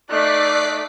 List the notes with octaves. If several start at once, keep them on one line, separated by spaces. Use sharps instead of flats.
A3 D#4 D5 D6 F#6 B6 C7